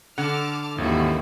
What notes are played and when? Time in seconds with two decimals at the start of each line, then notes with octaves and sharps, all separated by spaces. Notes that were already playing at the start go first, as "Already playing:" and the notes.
0.18 D3 F#5 A5 D6 F6
0.78 G#1 D#2 E3 C#4 F#4